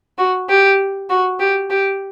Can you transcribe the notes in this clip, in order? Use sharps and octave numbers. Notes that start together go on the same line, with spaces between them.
F#4
G4
F#4
G4
G4